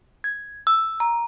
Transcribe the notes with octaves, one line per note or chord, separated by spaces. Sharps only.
G#6
E6
A#5